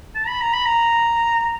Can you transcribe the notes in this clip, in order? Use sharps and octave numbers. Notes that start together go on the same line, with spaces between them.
A5
B5
A#5
B5
A#5